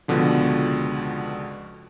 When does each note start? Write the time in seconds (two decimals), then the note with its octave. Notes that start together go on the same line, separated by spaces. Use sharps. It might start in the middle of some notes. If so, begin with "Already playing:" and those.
0.08 C#2 B2 D3 F3